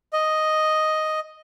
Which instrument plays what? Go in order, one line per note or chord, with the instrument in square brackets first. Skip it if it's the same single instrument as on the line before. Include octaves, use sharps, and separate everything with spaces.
[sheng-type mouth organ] D#5